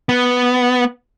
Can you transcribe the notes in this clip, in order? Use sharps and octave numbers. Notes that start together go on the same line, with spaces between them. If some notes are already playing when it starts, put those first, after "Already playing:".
B3